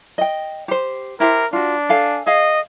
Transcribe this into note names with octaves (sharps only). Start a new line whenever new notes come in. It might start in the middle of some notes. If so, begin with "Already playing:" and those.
D#5 G5
G4 C5
E4 G4 A#4 C5
D4 F4 F#4
A4 F5 G#5
G#4 D#5 F5